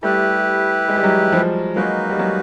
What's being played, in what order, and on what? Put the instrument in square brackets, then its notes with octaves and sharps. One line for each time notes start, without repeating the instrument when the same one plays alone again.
[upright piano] G3 A3 [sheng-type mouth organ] E4 G4 B4
[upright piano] G#3
G3
F#3 G#3
F3 G3
[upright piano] F#3 G#3 [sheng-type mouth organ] A#3 D#4 F#4 B4
[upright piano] G3
F#3 G#3